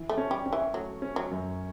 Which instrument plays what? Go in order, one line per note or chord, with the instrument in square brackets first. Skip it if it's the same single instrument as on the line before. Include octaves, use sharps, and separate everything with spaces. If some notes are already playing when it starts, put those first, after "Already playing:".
Already playing: [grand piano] E3
[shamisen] A3
[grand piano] C#4
[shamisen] G3
[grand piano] C#4
[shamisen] E3
[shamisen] F#3 [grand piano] A3
[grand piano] C#4
[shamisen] F#3
[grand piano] F#2